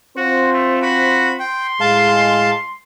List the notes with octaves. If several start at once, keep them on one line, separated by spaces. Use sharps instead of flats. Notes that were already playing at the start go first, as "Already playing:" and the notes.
C4 F4 F#4 C5
A3
F#4 B5
G5 C6
A2 G#3 F5 A5